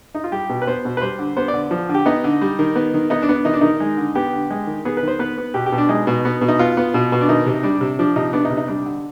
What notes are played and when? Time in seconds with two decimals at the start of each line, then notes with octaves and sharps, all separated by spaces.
0.15 D#4
0.24 F4
0.32 G3 G4
0.49 B2
0.62 B4
0.67 B3 C5
0.85 B2
0.97 B4
1.02 G3 C5
1.19 D3
1.37 B3 C5
1.48 D5
1.54 D3
1.71 F3
1.89 D3
1.95 G4
2.06 B3 D#4
2.24 D3
2.41 G3
2.59 D#3
2.76 B3
2.94 D#3
3.10 B3 D#4
3.22 D4
3.29 B3
3.34 D4
3.45 D#3 D#4
3.53 D4
3.61 D#3 D#4
3.80 G#3
3.97 D3
4.15 B3 G4
4.33 D3
4.51 G#3
4.67 D#3
4.85 B3 G#4
4.97 B4
5.03 D#3 C5
5.19 B3 B4
5.38 B3
5.54 B2 G4
5.66 G4
5.72 B2
5.78 D4
5.89 G#3 D#4
6.07 B2
6.25 B3
6.41 B2
6.48 D#4
6.59 B3 F4
6.77 B3
6.94 B2
7.12 B2
7.21 D4
7.29 D#3 D#4
7.46 C3
7.63 G3 D4
7.81 C3
7.99 F3 D4
8.16 C3 D#4
8.33 B3 D4
8.45 D#4
8.51 C3
8.57 D#4
8.68 G3 D4
8.86 D3